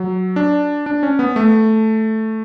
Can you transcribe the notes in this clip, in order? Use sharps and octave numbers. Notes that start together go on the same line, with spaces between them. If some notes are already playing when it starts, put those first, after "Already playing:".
Already playing: F#3
D4
D4
C#4
B3
A3